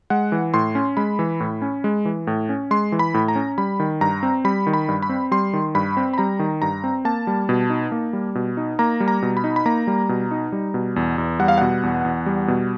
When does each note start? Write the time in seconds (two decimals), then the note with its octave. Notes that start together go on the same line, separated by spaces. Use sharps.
0.10 G#3 F#5
0.32 E3
0.54 A2 C6
0.75 C#4
0.97 G#3 B5
1.19 E3
1.40 A2
1.62 C#4
1.84 G#3
2.05 E3
2.27 A2
2.49 C#4
2.71 G#3 C6
2.92 E3
2.99 B5
3.14 A2
3.28 A#5
3.36 C#4
3.58 G3 B5
3.80 D#3
4.01 G2 A#5
4.23 C4
4.44 G3 B5
4.67 D#3
4.73 B5
4.89 G2
5.02 B5
5.09 C4
5.31 G3 C6
5.53 D#3
5.75 G2 B5
5.97 C4
6.13 B5
6.18 G3 A#5
6.39 D#3
6.62 G2 A#5
6.84 C4
7.05 A#3 A5
7.27 G3
7.49 B2
7.70 D#4
7.92 A#3
8.13 G3
8.35 B2
8.57 D#4
8.79 A#3 A#5
9.00 G3
9.08 A#5
9.22 B2
9.37 B5
9.44 D#4
9.56 B5
9.66 A#3 A#5
9.87 G3
10.09 B2
10.31 D#4
10.52 G3
10.74 B2
10.96 E2
11.18 E2
11.40 G3 F#5
11.48 F5
11.58 B2 F#5
11.83 E2
12.05 E2
12.26 G3
12.48 B2